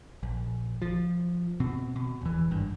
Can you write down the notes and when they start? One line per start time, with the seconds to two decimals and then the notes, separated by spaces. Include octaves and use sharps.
0.23 A#1
0.82 F3
1.60 B2 C4
1.96 B2
2.21 E1 E3
2.51 G#1 G2